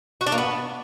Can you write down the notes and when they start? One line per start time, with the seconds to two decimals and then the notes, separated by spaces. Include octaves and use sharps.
0.21 F#4
0.26 D4
0.32 A#3
0.38 B3